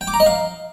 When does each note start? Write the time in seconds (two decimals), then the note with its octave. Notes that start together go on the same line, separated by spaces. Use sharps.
0.01 G5
0.07 D6
0.14 A#5
0.20 D#5
0.26 F5